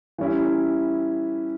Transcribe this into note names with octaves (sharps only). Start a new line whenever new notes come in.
E3 G3 C#4 E4